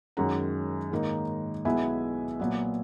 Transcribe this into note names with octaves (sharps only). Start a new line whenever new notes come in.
F#2 D#3 G#3 C#4 F#5 A#5
G#2 D#3 A#3 D#4
B1 B2 G#3 B3 E4 E5 G#5
A#2 F#3 B3